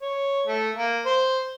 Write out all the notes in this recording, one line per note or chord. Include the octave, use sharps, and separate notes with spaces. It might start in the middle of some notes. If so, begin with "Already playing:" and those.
C#5
A3
A#3
C5